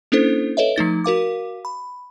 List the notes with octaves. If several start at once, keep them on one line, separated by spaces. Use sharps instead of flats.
A#3 C#4 D4 E4 A4 C5
A4 B4 C#5 D#5 E5
F3 A3 D#4 A6
F#4 A#4 F5 D6
B5